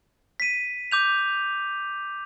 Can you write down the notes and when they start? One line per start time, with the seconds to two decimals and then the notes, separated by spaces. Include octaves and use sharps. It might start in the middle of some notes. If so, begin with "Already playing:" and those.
0.40 B6 D#7
0.91 D6 G6 F7